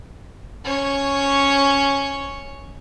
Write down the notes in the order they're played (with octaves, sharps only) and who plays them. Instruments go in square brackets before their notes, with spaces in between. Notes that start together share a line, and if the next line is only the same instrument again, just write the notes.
[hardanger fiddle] C#4 C#5